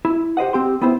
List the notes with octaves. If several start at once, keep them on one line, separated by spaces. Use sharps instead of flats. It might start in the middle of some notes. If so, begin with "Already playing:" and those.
E4
G4 C5 D#5 F#5
C4 G4 C6
B3 C4 E4 C5